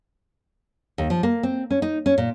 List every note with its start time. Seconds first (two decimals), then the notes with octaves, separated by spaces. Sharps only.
0.98 D#2
1.10 F3
1.23 A#3
1.43 C4
1.71 C#4
1.82 D#4
2.06 C#4
2.18 A#2